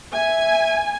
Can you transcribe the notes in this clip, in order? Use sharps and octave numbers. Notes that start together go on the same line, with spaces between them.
E5 G#5